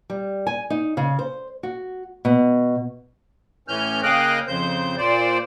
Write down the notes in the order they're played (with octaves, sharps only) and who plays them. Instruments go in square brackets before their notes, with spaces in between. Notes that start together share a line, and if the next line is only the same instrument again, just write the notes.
[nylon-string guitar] G3
G#5
D#4
C#3
C5
F#4
B2
[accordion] A2 E3 C#4 F6 G6
C#3 A#3 D#5 F5 G5 F#6
F2 C#3 C5 G6
A#2 C5 D5